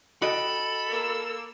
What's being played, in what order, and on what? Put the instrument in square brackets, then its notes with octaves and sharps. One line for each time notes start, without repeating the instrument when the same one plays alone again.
[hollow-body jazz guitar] F#4 D#5 G5 [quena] A4 [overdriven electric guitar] B5
[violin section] A#3 E6